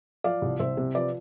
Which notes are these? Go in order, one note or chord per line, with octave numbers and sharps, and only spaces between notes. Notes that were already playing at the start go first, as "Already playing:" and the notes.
F3 D5 F5
C2
C2 C5 E5
C3
F3 B4 D5